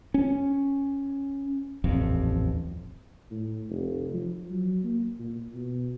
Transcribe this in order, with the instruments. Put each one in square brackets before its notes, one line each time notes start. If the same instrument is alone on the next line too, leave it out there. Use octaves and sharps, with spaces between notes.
[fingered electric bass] C#4
D#1 A1 F2
[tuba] A2
F1
F3
F#3
A#3
A#2
B2